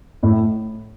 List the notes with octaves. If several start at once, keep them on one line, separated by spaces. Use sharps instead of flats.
A2